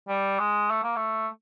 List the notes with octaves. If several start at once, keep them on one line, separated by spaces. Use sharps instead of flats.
G3
G#3
A3
A#3
A3